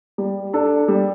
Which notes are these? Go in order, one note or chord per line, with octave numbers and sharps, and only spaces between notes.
G3
D4 A4
G3